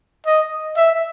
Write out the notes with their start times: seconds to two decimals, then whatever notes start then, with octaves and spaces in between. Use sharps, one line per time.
0.26 D#5
0.76 E5